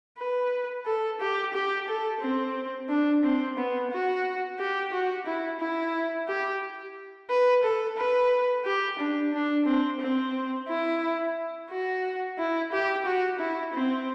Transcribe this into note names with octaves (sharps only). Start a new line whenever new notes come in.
B4
A4
G4
G4
A4
C4
D4
C4
B3
F#4
G4
F#4
E4
E4
G4
B4
A4
B4
G4
D4
D4
C4
C4
E4
F#4
E4
G4
F#4
E4
C4